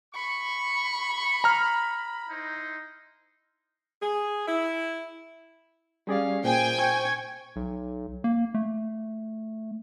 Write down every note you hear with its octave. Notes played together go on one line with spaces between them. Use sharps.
B5 C#6
A#5 F6
D#4 E4 C5
G#4
E4
G3 C#4 G#4 D5 F5
A#2 G#4 C5 G5 G#5
C#6 G#6
B1
A#3
A3